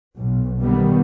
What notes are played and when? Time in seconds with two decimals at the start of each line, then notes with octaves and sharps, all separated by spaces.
0.15 B1
0.61 D3 D#3 G3 B3